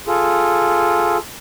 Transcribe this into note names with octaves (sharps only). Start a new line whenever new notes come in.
F4 G#4 A4